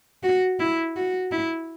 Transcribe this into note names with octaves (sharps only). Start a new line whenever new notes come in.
F#4
E4
F#4
E4